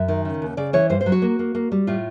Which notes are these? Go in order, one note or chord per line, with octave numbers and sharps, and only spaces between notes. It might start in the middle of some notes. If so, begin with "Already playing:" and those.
Already playing: F#2 E5
D#3
C#3
D#2
C#3 D5
E3 C#5
G2 C5
C5
F#3
F#4
A#3
A#3
A#3
G3
A2 F4